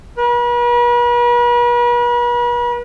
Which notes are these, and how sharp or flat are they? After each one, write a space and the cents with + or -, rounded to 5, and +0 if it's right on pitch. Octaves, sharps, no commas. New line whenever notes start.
B4 -40